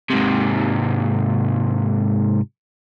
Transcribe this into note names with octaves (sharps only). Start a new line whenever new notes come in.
G#2 C3